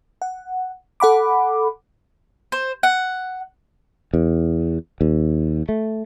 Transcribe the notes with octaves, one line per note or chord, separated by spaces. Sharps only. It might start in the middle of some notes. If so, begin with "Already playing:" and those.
F#5
A4 F#5 B5 D6
C5
F#5
E2
D#2
A3